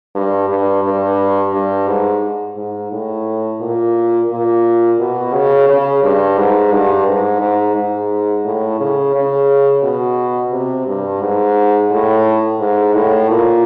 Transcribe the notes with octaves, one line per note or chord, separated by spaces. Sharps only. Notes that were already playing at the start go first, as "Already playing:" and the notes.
G2
G2
G2
G2
G#2
G#2
A2
A#2
A#2
B2
C#3
C#3
G2
G#2
G2
G#2
G#2
G#2
A2
C#3
C#3
B2
C3
G2
G#2
A2
G#2
A2
A#2